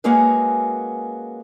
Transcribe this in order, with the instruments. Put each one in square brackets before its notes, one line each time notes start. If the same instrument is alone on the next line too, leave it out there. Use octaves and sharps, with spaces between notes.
[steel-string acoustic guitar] G#3 A#3 C#4 F#4 G#4 B4